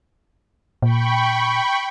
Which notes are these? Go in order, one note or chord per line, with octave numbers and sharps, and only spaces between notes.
A#2 G5 B5 C#6